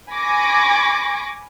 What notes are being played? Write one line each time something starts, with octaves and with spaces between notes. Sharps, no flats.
G#5 B5 C#6 D6 A#6